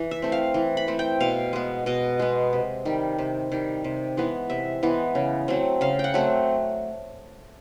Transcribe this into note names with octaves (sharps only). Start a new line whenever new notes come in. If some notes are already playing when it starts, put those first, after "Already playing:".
Already playing: E3
E5
A3 C4
F5
E3
B5
A3 C4
G5
B2 F5
G#3 B3
B2 D#5
G#3 B3
C3
D#3 G3
C3
D#3 G3
C3
E3 G#3 B3
C3 E5
E3 G#3 B3
C#3
F#3 A3 C4
C#3 F5
G5
F#5
F#3 A3 C4